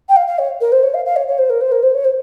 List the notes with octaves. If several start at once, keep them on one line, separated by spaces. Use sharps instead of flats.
G5
F5
F5
C#5
A#4
C5
C#5
F5
F5
C#5
C#5
C5
A#4
C5
A#4
C5
C#5
C5